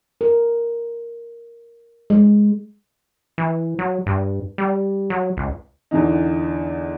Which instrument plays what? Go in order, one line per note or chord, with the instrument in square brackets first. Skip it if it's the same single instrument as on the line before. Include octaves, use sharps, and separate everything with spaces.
[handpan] A#4
G#3
[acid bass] E3
F#3
G2
G3
F#3
C#2
[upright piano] E2 D3 E3 D#4